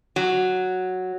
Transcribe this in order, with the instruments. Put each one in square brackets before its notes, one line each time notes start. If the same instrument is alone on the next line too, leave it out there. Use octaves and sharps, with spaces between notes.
[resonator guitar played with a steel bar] F#3